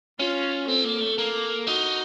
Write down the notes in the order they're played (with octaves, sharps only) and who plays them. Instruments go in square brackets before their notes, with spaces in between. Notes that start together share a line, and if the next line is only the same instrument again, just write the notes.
[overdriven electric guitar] C#4 [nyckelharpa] F4
[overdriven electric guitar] C4 [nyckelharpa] A4
[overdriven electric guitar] A#3
A3
A#3
[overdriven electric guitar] D#4 [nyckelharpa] F#4